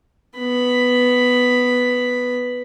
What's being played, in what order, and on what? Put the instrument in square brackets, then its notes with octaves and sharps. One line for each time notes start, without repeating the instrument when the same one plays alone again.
[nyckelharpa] B3 B5